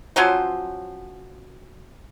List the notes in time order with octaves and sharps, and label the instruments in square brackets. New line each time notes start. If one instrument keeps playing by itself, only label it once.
[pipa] F3 F#3 C#4 C5